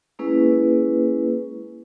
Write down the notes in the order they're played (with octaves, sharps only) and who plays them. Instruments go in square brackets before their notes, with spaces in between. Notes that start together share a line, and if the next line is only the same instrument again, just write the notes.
[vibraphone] G#3 A#3 C#4 E4 G#4 B4